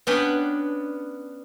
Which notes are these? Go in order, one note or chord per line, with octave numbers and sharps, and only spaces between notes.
B3 C#4 D4 B4 F#5 G5